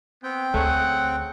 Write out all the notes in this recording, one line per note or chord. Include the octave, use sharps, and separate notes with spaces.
B3 C4 G5
D2 A3 C#4 G#4 F#5